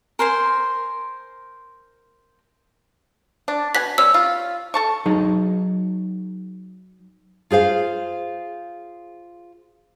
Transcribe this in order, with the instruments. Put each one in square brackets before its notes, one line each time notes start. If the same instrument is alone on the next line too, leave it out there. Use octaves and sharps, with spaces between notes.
[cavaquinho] A#4 C5 G#5 C6
[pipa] D4
[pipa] B2 F#5 G#5 [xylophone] B6
[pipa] G3 C#4 [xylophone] E6
[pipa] F4
A4 A5 C#6
[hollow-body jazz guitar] F#3 D#4 G#4 A#5
[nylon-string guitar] F4 G#4 C5 F5